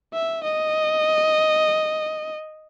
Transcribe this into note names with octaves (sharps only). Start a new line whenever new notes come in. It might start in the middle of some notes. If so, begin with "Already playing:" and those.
E5
D#5